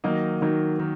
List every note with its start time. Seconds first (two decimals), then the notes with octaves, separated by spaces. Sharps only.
0.04 D#3 F#3 A#3 D#4 D#5
0.41 D#3 F#3 A#3 D#4
0.79 D#3